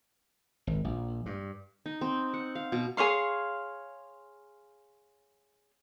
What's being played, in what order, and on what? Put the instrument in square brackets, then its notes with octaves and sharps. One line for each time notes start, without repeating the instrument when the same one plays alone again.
[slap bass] G#1
A#1
G2
[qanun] D#4
C4
F#5
F5
B2
[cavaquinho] G#4 C#5 F5 C6